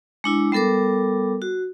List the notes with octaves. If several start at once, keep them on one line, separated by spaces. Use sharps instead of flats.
G#3 D4 E4
G3 B3 A4 A#4 D6
F#4